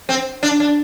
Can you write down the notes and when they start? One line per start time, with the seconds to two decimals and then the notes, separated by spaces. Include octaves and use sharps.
0.09 C4
0.43 D4
0.60 D4